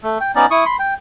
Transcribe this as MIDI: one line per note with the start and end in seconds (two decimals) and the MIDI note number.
0.03 0.18 57
0.21 0.32 79
0.35 0.46 59
0.35 0.46 61
0.35 0.46 63
0.35 0.46 74
0.51 0.65 64
0.51 0.65 85
0.51 0.65 87
0.65 0.77 83
0.65 0.77 84
0.79 0.94 79